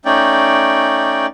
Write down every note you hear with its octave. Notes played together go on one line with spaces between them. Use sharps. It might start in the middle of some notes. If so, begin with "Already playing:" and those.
A3 C#4 D#4 D5 G5